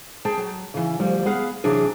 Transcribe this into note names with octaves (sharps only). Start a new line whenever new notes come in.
G#4 G5 A5
F#3
C#3 E3
D2 F3 G3
B3 G#4 F5 F#5
C3 E3 F#3 D4 G#4